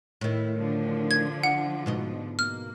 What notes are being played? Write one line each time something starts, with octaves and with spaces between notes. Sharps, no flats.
A2 D#3 E4
D3 F3 D4
G#6
F#5
G#2 B2 D#5
A#3 F6